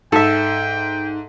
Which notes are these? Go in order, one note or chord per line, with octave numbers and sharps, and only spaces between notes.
G#2 A4 E5 G5